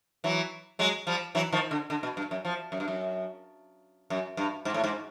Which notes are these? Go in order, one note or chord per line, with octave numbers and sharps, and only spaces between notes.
E3 F#3
F#3 G#3
F3 G3
E3 F#3
D#3 F3
D3
D3
B2
G2
F#2
F3
F#2
G2
F#2
F#2
G2
G#2
A2
G#2